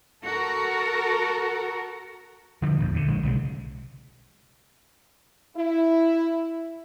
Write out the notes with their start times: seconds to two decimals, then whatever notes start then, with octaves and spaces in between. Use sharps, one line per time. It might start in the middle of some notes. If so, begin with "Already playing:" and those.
0.24 F#4 A4 A#4
2.62 D3 F3 G3
2.80 A#1 E2 G#2
2.94 D2 D3
3.08 A#1 G#3
3.23 B1 C#3 G3 G#3
5.57 E4